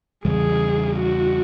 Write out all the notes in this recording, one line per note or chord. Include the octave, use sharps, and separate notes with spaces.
E2 C#3 E3 G3 G#4
F#4